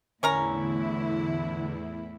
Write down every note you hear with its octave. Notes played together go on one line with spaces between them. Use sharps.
E2 A2 D3 C#4 E4 A#4 A#5